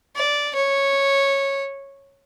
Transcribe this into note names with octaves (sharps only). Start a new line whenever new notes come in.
D5
C#5